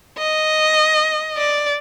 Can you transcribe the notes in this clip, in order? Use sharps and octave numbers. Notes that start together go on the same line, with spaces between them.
D#5
D5